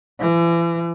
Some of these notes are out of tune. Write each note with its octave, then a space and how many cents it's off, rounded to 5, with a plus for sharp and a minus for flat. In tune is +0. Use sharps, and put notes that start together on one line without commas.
E3 +40